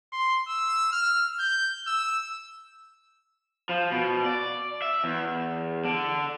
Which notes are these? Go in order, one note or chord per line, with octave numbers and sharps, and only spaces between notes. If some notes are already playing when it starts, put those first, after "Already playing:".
C6
E6
F6
G6
E6
F3
B2
D5
E5
E2
D3